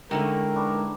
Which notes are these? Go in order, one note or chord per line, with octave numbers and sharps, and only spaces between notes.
D3 G#3 A3 C#4 D#4 E4 A#4 G5
B3 D4 C#6